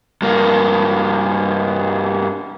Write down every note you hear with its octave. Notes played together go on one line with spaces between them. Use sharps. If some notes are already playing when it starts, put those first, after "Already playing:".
G2 A#3